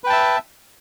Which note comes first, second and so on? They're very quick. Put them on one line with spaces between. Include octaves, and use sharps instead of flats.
B4 G5 A5 E5